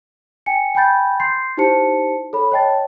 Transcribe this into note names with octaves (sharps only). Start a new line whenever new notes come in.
G5 G#5 C#7
G5 G#5 B5 G6 A6
C6 G6 A6 C7
D#4 E4 G4 C5 A5 C#7
A4 C#5 B5
C#5 D#5 G5 A5 A6